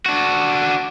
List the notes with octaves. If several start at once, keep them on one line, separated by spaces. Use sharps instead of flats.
D4 F#4